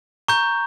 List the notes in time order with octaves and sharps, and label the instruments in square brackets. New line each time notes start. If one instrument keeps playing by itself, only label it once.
[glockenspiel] A#5 C#6 G6